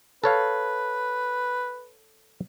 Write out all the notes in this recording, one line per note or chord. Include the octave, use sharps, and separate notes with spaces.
A4 B4 C#5 F5